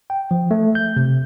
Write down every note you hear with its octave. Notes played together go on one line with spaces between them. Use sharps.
G5
F3
A3
G6
C3